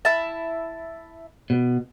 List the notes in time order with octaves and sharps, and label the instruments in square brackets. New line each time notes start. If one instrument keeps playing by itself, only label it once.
[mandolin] E4 E5 A5
[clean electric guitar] B2